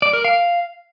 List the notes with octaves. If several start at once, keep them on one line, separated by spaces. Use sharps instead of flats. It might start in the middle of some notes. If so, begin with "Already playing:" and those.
D5
A#4
F5